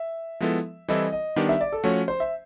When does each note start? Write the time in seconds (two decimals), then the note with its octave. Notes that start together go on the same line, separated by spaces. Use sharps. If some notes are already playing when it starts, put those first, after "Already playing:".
Already playing: E5
0.40 F3 G#3 B3 E4 A4
0.88 E3 G3 C4 E4 A4 D#5
1.12 D#5
1.36 D#3 G3 B3 D4 G4
1.49 E5
1.61 D5
1.72 A4
1.84 F3 A3 C#4 F#4 C#5
2.08 C5
2.20 E5